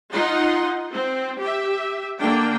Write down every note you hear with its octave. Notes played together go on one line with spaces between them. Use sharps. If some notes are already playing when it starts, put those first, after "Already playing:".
D#4 F4 F#5 C6
C4
G4 E5
D3 A#3 D4 G5